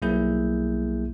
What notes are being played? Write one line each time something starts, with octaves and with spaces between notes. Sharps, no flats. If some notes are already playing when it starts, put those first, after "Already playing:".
B1 G3 A#3 E4 G#4 G6